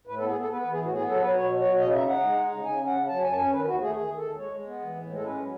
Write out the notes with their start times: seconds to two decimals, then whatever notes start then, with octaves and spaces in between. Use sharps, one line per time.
0.07 A2 B4
0.18 A4
0.21 B3
0.29 G#4
0.36 B3 A4
0.50 B3 B4
0.62 B4
0.65 E3
0.72 G#4
0.79 A2 F#4
0.93 B3 G#4
1.07 F#3 A4
1.22 F#3 B4
1.36 B2 C#5
1.50 F#3
1.58 C#5
1.65 B2
1.79 C#3 D#5
1.93 D#4 E5
2.08 D#4 F#5
2.23 G#3
2.37 D#4
2.52 C#3
2.65 C#3 G#5
2.80 C#4
2.86 F#5
2.94 C#3
3.08 F#3 A5
3.23 F#2 G#5
3.31 A5
3.37 C#4 G#5
3.52 D#3 B4
3.66 D#2 F#4
3.80 A3 G#4
3.95 D#3 G#4
4.09 D#3
4.16 A4
4.23 D#2
4.37 G#3 C#5
4.52 G#3
4.66 B3
4.81 E3
4.95 A2
5.09 G#3
5.15 A4
5.23 C#4 B4
5.38 F#3